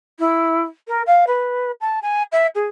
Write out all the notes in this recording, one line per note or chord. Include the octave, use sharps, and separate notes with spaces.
E4
A#4
F5
B4
A5
G#5
E5
G#4